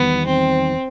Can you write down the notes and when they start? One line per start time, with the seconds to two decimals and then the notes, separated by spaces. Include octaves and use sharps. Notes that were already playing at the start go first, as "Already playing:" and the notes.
Already playing: E2 D#3 G3 B3 D#4
0.27 C4